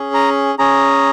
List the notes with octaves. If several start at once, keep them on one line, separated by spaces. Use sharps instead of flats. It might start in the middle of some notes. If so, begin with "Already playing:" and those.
Already playing: C#4 G#4
A#5
C#4 G#4 A#5